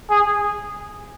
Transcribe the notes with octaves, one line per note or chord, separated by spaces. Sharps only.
G#4